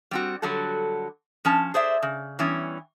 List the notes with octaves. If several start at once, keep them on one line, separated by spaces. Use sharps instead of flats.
G3 C4 F#4
D3 F#3 G3 F#4 A4
F3 C#4 A5
G#4 C5 D5 E5
C#3
E3 G3 B3 C#4